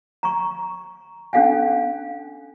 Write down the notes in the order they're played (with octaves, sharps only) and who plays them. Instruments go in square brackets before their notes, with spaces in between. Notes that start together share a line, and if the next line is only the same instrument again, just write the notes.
[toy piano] A#5 C#6
C#4 D4 A4 F5 F#5 G#5